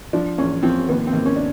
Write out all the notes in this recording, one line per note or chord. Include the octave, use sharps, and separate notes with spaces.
F3 D4
E2 C#4
F3 C4
D#2 B3
C4
D#2
C#4
D4